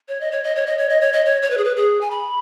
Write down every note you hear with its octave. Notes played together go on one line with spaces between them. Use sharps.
C#5
D#5
C#5
D#5
C#5
D#5
C#5
D#5
C#5
D#5
C#5
C#5
B4
G#4
B4
G#4
G#5
B5